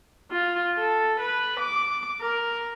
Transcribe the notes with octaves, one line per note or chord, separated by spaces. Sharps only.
F4
A4
B4
D6
A#4